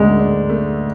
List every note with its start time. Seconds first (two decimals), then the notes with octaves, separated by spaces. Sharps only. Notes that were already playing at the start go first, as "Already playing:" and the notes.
Already playing: D2 D3 G#3 A3 D4
0.19 D4
0.50 A3